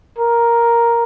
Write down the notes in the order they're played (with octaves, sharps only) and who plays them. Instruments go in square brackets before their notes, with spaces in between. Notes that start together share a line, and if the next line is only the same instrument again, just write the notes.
[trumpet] A#4